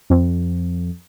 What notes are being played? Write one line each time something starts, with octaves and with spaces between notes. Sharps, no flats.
F2